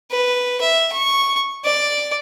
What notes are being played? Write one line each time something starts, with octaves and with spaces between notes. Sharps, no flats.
B4
E5
C#6
D5